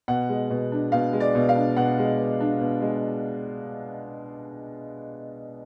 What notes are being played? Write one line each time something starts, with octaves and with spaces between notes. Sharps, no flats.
B2 F#5
G#3
B2
D4
B2 F5
G#3
D5
B2
F5
D4
B2 F#5
G#3
B2
D4
B2
G#3